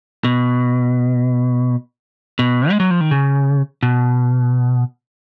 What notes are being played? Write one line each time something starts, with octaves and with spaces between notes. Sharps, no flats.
B2
B2
G#3
F#3
F3
D#3
C#3
B2